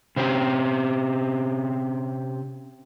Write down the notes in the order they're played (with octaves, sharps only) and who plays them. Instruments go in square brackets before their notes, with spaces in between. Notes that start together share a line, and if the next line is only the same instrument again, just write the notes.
[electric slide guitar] C3 C4 C#4 G4